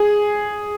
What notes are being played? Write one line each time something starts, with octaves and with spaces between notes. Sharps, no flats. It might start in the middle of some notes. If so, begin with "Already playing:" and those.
Already playing: G#4